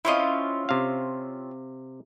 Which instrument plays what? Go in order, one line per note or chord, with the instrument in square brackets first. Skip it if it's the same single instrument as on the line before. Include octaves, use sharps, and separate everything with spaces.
[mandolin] C4 C#4 F4 [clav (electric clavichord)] E4 D#5
[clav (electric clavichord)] C3 F5